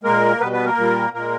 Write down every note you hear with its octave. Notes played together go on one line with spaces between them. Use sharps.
A#2 G#3 A#3 A#4
B2 G3 B3 B4
B3 B4
A#3 A#4
A#2 G3
A#2 G#3 A#3 A#4